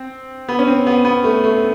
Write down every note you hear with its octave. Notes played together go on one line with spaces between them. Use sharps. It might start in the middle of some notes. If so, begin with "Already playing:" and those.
Already playing: C4
B3
C#4
C4
B3
B3
A3
A3